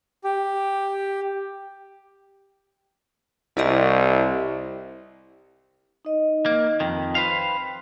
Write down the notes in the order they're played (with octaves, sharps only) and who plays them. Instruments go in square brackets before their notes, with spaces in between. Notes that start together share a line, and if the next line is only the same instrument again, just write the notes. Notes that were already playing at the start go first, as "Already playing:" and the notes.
[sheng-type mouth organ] G4
[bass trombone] C2 [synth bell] E4 G4 D#5
[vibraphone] D#4 D#5
[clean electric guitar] A#3
[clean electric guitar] F2 D#3 [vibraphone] G5
[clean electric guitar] B4 C5 F5